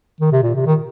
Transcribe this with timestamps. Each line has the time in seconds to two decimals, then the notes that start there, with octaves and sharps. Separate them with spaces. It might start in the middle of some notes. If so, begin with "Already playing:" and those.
0.21 D#3
0.32 C3
0.43 A#2
0.55 C3
0.66 D#3